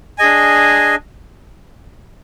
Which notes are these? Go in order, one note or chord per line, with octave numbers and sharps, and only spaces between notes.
D4 G#4 D#5 G#5